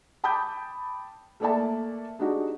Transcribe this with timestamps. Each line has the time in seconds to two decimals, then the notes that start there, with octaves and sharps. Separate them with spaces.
0.24 G5 A5 B5 D6 D#6 G6
1.40 A3 A#3 A4 D5 E5 A5
2.19 G#3 D4 D#4 F#4 G4